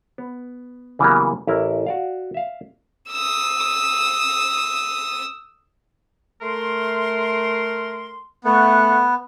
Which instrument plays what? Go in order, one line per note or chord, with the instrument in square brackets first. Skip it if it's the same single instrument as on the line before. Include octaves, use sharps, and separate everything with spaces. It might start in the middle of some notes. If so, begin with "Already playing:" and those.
[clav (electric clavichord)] B3
C#3 E3 F#3 G3 A#3 B3
A1 E4 A#4 E5
F#4 D5 F5
E5 F5
[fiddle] D#6 E6
[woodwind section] A3 A#4 C6
[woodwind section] A3 F#5 [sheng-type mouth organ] B3